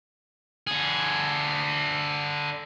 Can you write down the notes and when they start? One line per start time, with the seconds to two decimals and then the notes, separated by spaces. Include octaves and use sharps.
0.67 D3 G#4